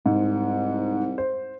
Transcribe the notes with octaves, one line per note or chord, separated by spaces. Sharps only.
C2 G#2
C5